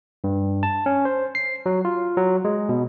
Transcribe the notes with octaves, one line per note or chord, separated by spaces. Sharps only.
G2
A5
C#4
C5
C7
F#3
F4
F#3
G#3
B2